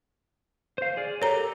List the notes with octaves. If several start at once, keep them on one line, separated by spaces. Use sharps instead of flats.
C5 F5
G#4 D5 F6
G4 A4 A#4 C#5 A#5